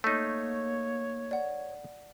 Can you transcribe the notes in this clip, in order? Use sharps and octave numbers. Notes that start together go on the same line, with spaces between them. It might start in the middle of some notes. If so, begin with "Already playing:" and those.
A3 A#3 D#4 C#5
D5 F#5